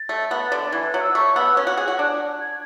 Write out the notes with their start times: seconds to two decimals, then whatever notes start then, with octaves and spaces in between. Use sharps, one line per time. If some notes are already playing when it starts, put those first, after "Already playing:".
Already playing: A6
0.09 A3
0.31 B3
0.52 D3
0.72 E3 G#6
0.86 F#6
0.94 F#3
1.01 E6
1.15 A3 C#6
1.36 B3 E6
1.56 C#4 F#6
1.67 F#4
1.77 G#4
1.88 F#4
1.99 D4
2.40 G#6